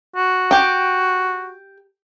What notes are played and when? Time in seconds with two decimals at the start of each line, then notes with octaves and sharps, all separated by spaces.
0.16 F#4
0.51 G4 G5